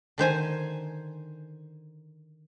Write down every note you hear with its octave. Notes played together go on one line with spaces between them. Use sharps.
D3 D#3 C5 G#5